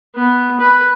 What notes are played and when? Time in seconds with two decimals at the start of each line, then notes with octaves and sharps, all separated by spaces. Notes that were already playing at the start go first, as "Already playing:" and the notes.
0.15 B3
0.60 B4